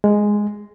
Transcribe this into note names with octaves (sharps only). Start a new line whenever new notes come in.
G#3